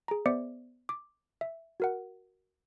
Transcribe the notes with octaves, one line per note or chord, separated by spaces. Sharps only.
G#4 A#5
B3 C5 D5 E5 D6 C#7
D6
E5
F#4 A#4 F#5